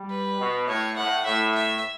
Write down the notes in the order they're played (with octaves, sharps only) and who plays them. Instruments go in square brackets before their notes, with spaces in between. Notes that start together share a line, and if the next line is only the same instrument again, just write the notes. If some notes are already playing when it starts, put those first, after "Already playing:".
Already playing: [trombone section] G3
[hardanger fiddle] B4
[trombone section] B2
[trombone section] A2 [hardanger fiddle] C#5
[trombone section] A2 [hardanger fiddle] F#5
[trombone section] A2 [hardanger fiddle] E5
[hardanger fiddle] E5